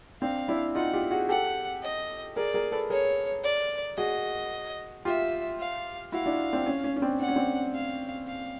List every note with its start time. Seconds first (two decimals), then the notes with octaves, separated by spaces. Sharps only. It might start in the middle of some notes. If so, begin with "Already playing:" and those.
0.22 C4 D4 F5
0.48 D4 E4
0.75 D#4 F4 F#5
0.93 F4 G4
1.11 F#4 G#4
1.29 G4 A4 F#5
1.83 D#5
2.36 G#4 A#4 D5
2.54 G#4 A#4
2.72 A4 B4
2.90 G#4 A#4 C#5
3.44 D5
3.97 F#4 G#4 D#5
5.05 F4 G4 E5
5.59 F5
6.12 E4 F#4 F5
6.26 D4 E4
6.53 C4 D4
6.66 C#4
6.84 C#4
6.96 C#4
7.02 C4 D4
7.20 D4 F#5
7.28 C#4
7.35 C4 D4
7.74 F5
8.27 F5